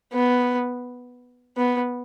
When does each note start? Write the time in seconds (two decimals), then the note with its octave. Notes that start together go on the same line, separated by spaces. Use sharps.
0.13 B3
1.57 B3